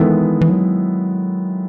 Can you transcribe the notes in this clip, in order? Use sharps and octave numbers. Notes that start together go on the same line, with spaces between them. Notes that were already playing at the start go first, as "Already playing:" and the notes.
Already playing: D#3 E3 G#3 B3 E4 A4
E3
F#3